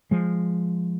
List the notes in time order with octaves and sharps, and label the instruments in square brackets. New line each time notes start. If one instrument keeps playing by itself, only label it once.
[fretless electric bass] F3 G#3